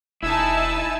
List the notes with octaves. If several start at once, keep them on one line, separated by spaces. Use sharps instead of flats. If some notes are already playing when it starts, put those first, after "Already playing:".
E1 D#4 E4 E5 G#5 A5 E6